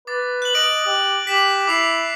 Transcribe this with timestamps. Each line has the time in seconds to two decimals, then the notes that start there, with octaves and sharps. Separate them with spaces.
0.07 B4 D6 A6
0.42 F#6 F#7
0.54 D#5 A#6 D7 F#7
0.86 G4
1.27 G4 B6 E7 F#7
1.67 E4 D6 C7 F7